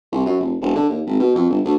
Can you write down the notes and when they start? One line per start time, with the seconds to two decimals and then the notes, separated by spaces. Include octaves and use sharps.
0.12 C2
0.26 F#2
0.40 F1
0.61 E1
0.75 D3
0.89 D#2
1.06 G#1
1.19 B2
1.35 F2
1.50 G1
1.65 D2